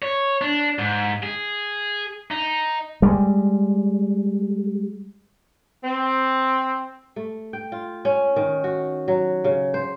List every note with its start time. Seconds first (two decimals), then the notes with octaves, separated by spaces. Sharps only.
0.02 C#5
0.42 D4
0.79 G#2
1.23 G#4
2.31 D#4
3.02 G3 G#3
5.84 C4
7.16 A3
7.53 G5
7.72 F4
8.05 C#4
8.36 D#3
8.64 F#4
9.08 F#3
9.44 C#3
9.74 C5